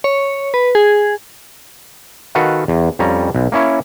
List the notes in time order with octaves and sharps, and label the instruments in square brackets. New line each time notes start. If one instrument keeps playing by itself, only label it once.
[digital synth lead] C#5
B4
G#4
[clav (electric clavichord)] D#3 F#4 A4 B4 F5 F#5
E2
F2 G3 C#4 A#5
B1
A#3 C#4 E4 C#5